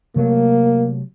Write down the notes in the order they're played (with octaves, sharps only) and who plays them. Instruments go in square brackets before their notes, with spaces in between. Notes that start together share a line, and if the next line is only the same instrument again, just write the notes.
[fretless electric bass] C3 F#3 A3 [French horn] A#3